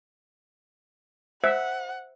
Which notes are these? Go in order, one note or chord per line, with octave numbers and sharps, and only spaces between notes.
C5 E5 F#5